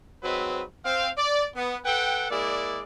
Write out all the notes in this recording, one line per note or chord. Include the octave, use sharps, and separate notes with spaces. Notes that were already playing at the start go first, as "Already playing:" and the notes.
G#2 F#3 C4 B4
C4 F5
D5
B3
A4 B4 F#5 G5
G#3 A#3 E4 D5